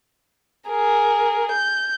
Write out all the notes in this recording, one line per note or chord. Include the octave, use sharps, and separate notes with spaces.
G#4 A#4
G6